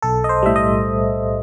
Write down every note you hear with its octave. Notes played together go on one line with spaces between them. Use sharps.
B1 A4
D#5
C5
A2 G3 E5
D#5